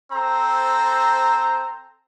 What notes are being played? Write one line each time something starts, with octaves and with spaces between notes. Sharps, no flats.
C4 A4 C5 A#5